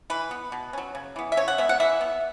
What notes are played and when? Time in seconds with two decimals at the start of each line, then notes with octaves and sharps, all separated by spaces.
0.10 E3 B4
0.31 B3
0.52 B2
0.73 F#3 C#4
0.95 C#3
1.16 E3 B3
1.32 E5
1.37 C#3 C#5
1.48 F#5
1.58 G#3 B3 E5
1.69 F#5
1.80 E3 E5
2.01 B3